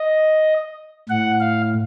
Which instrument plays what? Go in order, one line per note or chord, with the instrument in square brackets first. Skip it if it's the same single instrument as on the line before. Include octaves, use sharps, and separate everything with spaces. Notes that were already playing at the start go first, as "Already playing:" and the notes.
Already playing: [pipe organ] D#5
A2 F#5
F5